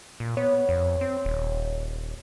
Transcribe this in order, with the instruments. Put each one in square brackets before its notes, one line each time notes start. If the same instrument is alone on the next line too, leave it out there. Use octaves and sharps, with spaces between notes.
[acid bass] A#2
[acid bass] B3 [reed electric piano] C#5
[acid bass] F2
C4
D#1